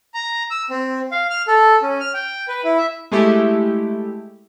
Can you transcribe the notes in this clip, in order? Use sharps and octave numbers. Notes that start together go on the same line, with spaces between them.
A#5
E6
C4
F5
F6
A4
C#4
F6
G5
B4
E4
E5
G#3 A3 E4 G4